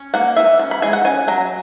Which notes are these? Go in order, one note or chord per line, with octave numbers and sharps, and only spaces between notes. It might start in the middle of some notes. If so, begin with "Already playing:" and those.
Already playing: C#4
A#3 F#5
E3 E5
C#4
B5
G#3 G#5
F#5
C#4 G#5
F#3 A#5